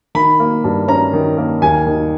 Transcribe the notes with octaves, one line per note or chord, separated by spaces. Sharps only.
D#3 B5
A#3
G2
C#4 A#5
D#3
A#3
D#2 G#5
D#3